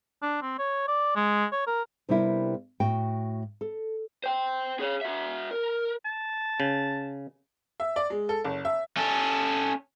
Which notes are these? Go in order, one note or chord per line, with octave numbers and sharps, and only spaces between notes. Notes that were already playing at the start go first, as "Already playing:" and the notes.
D4
C4
C#5
D5
G#3
C#5
A#4
C3 G3 B3 D4 E4 A#4
A2 F#4 G5
A4
C5 G5
G#4 C#5
F#4 E5
A#4
A5
C#3
E5
D5
G#3
A4
F#1
E5
C#4 A4